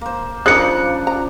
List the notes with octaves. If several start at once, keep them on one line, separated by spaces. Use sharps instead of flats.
A#3 C5
C#3 F3 D4 D#4 G#4 A#4 F#6 C#7
F3 A#5